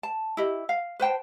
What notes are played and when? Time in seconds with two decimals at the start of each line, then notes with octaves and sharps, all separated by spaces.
0.03 A5
0.37 E4 G4 D#5
0.69 F5
1.00 B4 C5 G5 A5